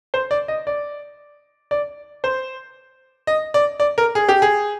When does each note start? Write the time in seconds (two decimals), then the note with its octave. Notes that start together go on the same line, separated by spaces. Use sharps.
0.14 C5
0.31 D5
0.48 D#5
0.67 D5
1.71 D5
2.24 C5
3.27 D#5
3.54 D5
3.80 D5
3.98 A#4
4.15 G#4
4.29 G4
4.42 G#4